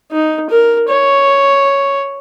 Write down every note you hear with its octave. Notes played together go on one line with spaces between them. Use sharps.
D#4
A#4
C#5